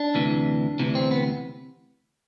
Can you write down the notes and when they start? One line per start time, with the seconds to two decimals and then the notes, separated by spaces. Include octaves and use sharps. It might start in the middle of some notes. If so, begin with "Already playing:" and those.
Already playing: D4
0.15 D2 C3 E3
0.79 D2 C3 E3
0.95 C4
1.11 B3